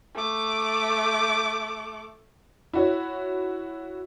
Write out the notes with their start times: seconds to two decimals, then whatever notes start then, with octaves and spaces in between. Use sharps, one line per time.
0.15 A3 D6
2.73 E4 F#4 C#5